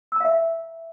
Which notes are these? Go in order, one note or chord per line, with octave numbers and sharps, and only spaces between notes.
E5 F5 A#5 E6